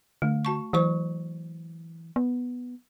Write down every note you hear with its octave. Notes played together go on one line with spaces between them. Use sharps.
D3 A3
F#4 A5 C#6
E3 F#3 C5 C#6
B3